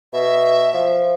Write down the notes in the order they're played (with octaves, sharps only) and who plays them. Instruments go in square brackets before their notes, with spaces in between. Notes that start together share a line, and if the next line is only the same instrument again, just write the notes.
[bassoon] B2 [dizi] E5
[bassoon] F3